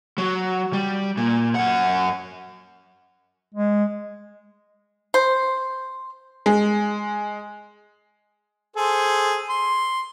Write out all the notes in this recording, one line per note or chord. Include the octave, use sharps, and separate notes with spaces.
F#3
G3
A#2
F#2 F#5
G#3
C5
G#3
G#4 A4 C5
C6